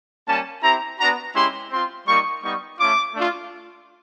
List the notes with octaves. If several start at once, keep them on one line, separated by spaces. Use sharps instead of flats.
G3 A#3 C#4 A5
C4 E4 G4 A#5
B3 D4 F#4 A#5
G#3 C#4 E4 G4 C6
C4 F4 C6
G3 A#3 D#4 C#6
G3 B3 D#4 C#6
A3 C#4 F4 D6
A3 D4 F4